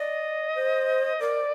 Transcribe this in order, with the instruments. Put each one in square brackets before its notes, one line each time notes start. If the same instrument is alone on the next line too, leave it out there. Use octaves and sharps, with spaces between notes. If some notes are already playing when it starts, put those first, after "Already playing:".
Already playing: [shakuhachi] D5 [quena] D#5
[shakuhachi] C5
[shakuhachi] A#4 [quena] D5